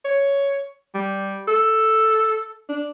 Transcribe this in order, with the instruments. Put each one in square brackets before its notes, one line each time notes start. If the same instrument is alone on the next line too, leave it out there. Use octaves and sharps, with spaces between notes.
[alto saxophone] C#5
G3
A4
D4